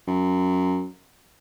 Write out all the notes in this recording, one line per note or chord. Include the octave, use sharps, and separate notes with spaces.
F#2